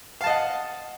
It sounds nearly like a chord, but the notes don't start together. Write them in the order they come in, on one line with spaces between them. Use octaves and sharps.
F5 A5 D#5 F#5